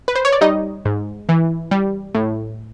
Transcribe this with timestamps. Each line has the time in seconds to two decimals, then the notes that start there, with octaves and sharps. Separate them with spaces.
0.08 B4
0.15 C5
0.25 C#5
0.32 D5
0.41 G3 D#4 D#5
0.85 G#2
1.29 E3
1.71 G3
2.14 A2